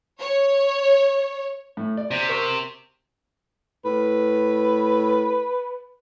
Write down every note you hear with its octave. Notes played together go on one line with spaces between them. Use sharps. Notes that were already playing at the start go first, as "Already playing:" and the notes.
C#5
A2
D5
C3
A#4 C#6
A2 B4